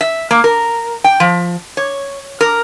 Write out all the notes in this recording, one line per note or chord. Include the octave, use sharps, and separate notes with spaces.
E5
A#3
A#4
G5
F3
C#5
A#4